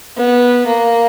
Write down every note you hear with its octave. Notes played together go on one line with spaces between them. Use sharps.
B3
A#3